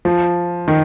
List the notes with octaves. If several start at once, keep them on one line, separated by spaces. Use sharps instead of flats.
F3
D#3